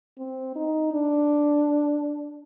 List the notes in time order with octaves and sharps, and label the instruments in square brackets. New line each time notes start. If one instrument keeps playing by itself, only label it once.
[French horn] C4
D#4
D4